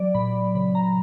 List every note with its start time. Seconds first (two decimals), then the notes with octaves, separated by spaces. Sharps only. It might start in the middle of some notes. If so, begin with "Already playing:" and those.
Already playing: F#3 D5
0.15 A#2 B5
0.55 C#3 B5
0.75 A#5